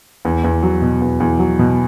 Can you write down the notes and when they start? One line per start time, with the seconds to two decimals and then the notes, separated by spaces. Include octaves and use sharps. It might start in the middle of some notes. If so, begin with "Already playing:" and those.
0.25 E2
0.44 E2
0.63 F#3
0.82 B2
1.02 E2
1.20 E2
1.39 F#3
1.59 B2